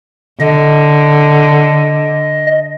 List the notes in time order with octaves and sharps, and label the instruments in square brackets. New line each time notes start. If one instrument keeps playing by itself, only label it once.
[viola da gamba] D3 [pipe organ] D#5